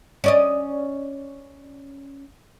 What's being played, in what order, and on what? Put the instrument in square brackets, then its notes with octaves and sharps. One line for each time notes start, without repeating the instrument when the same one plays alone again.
[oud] C#4 D5 D#5